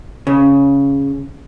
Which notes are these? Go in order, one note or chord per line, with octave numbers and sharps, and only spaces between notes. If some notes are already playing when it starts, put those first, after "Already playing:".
C#3